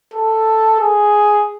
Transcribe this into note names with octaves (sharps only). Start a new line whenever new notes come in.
A4
G#4